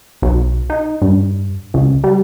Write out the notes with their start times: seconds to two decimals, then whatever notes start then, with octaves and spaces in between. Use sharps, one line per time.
0.22 B1
0.70 D#4
1.02 G2
1.74 C#2
2.04 G3